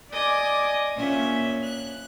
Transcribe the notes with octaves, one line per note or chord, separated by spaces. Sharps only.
D5 D#5 G#5 D6
A#2 C#4 E5
F#6